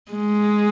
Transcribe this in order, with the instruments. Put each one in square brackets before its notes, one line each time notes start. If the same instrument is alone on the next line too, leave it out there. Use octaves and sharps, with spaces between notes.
[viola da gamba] G#3